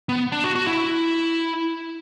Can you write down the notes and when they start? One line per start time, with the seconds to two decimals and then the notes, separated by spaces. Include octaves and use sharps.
0.09 B3
0.32 D4
0.44 F#4
0.55 F#4
0.67 E4